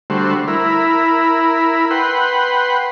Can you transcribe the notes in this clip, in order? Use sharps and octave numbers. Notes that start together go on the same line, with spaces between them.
D3 G3 A3 F#4 C5
E4 A#4 B5
B4 F#5 G5 C6